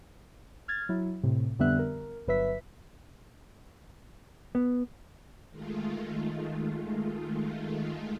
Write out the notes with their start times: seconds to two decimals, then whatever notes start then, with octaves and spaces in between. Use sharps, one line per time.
0.68 F6 G#6 A6
0.89 F#3 E4
1.23 A2 C3
1.59 F2 D3 G3 B3 E5 F#6
1.79 A#4
2.27 G1 F#3 B4 E5 B6
4.55 B3
5.51 D#3 G#3 A3 F4